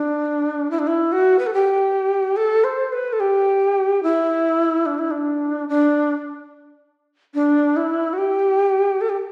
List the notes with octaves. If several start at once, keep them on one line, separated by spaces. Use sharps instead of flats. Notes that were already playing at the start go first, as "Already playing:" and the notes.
Already playing: D4
E4
D4
E4
F#4
B4
A4
G4
A4
C5
B4
A4
G4
E4
D4
E4
D4
D4
D4
E4
F#4
G4
A4
G4